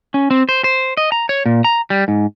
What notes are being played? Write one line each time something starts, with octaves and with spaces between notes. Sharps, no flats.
C#4
C4
C5
C5
D#5
A#5
C#5
A#2
A#5
G3
G#2